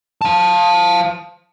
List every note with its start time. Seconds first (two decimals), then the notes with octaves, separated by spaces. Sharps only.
0.21 F5 A5